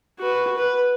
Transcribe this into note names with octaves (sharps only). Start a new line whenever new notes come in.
F#4 B4
B4